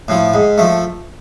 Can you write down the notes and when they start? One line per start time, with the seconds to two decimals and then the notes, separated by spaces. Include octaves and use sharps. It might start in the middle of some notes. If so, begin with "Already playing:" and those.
0.08 A2 F3
0.34 G#2
0.58 F3 A3